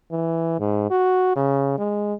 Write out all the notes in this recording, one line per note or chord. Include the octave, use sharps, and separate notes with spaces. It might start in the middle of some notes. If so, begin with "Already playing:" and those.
E3
G#2
F#4
C#3
G#3